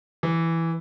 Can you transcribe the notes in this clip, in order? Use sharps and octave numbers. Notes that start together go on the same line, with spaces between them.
E3